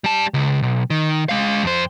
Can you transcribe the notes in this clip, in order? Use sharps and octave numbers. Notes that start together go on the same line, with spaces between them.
G3 A5
C#2
B1
D#3
G#3 F5
F2 C5